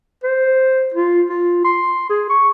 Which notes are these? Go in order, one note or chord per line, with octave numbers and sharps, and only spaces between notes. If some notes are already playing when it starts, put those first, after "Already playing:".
C5
F4
F4
C6
G#4
C#6